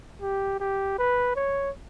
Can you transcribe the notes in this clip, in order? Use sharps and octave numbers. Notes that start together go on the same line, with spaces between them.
G4
G4
B4
C#5